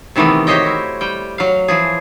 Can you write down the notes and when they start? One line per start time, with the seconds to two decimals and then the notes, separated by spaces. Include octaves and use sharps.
0.16 C3 D#3 E3 A3 B3
0.47 F#4 G4 C5 C#5 D#5 G5
0.66 E4
1.01 G3 G5
1.38 F#3 F5
1.68 E3 F3 G#4